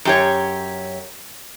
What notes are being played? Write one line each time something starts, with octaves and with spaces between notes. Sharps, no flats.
F#2 G4 C#5